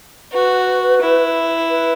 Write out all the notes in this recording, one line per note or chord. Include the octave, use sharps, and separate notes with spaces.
F#4 B4
E4
B4